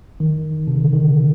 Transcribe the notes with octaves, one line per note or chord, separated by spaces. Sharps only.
D#3
C3
C#3
D3
D#3